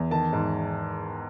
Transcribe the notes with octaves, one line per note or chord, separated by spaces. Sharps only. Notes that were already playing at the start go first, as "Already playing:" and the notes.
Already playing: E2
D#3 A5
G#2